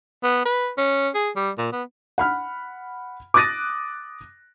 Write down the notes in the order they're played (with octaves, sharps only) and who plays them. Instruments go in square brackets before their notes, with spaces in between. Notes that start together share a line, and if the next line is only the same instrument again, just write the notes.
[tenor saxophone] B3
B4
C#4
G#4
G3
A#2
B3
[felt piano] F#5 B5 F6
D6 D#6 F#6 A6 A#6 D#7